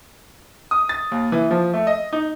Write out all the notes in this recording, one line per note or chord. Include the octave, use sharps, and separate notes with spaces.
D#6
A6
D#2
E3
F3
A3
D#5
D#4